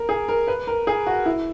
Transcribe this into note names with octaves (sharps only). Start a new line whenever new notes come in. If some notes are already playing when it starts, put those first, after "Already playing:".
Already playing: A#4
G#4
A#4
B4
A#4
G#4
F#4
E4